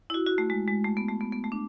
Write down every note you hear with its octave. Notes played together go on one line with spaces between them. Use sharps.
E4
F#4
F#4
A3
G#3
G#3
A3
B3
A3
B3
B3
A3
D4